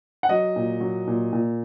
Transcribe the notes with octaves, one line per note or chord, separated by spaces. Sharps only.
F#5
F#3 D#5
A#2
F#3
A#2
A#2